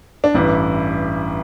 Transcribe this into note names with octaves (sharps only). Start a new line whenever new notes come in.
D4
A1 G2 E3 E4